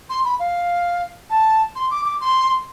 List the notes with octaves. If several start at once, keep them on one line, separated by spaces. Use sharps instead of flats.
C6
B5
F5
A5
C6
D6
D6
C6